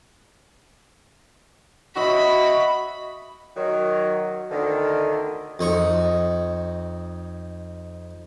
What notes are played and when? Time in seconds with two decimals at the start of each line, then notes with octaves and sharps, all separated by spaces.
1.96 F#4 C#5 D#5 E5 B5
3.57 D#3 F#3
4.51 D2 D3 D#3
5.59 F2 D#4 C#6